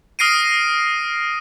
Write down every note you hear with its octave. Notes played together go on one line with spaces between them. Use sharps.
D#6 F6 A#6 C7 D7 D#7